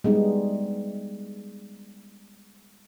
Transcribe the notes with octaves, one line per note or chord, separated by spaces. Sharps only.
G3 G#3 B3 D#4